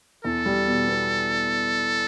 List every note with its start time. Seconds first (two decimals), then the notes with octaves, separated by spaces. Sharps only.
0.24 E2 A4
0.46 G3
0.67 B2
0.88 B3